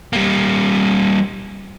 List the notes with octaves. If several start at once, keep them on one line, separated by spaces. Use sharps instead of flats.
G3 A#3